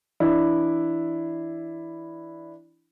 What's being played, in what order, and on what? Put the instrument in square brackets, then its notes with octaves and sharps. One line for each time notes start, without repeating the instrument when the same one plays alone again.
[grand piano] E3 D4 E4